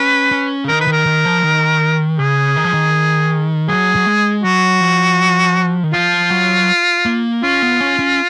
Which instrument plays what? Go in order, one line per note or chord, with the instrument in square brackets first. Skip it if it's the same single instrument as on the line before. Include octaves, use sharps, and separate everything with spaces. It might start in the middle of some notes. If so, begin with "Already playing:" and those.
Already playing: [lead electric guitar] C#4 [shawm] B4
[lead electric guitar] C#4
C#3
[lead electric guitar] D#3 [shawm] A#4
[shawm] B4
[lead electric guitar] D#3 [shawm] A#4
[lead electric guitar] D#3
F3
D#3
[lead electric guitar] C#3 [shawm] G#4
[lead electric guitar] D#3
F3
D#3
[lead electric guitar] F#3 [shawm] G#4
[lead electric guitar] F#3
G#3
[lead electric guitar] F#3 [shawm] F#4
[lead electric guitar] F3
D#3
[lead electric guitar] F3 [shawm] F4
[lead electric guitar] F#3
A#3
[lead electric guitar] C#4 [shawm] F4
[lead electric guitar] B3
C#4
C#4